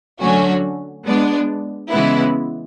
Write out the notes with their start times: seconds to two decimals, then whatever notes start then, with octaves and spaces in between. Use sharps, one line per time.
0.21 D3 F#3 A3 C#4 F#4
1.05 G#3 B3 D4
1.90 C#3 E3 G#3 B3 E4